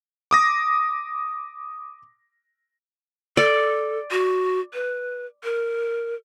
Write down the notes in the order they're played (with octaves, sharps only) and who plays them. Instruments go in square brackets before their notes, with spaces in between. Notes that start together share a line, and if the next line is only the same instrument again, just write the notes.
[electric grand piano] D6 D#6 A#6
[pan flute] A4 [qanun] D5
[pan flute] F#4
B4
A#4